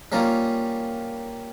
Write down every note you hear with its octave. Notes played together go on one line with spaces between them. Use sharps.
G3 A#3 C#4 F4 A#4